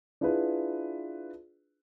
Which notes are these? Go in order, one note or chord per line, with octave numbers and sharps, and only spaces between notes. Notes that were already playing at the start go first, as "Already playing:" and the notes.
D4 E4 F4 G#4 B4